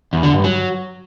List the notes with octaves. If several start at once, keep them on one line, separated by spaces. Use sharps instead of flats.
E2
D3
G2
F#3